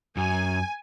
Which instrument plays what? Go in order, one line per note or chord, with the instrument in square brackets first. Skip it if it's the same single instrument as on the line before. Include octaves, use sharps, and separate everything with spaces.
[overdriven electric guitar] F#2 [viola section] G#5